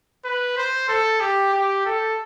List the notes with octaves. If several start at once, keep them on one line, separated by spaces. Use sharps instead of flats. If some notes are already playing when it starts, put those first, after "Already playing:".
B4
C5
A4
G4
G4
A4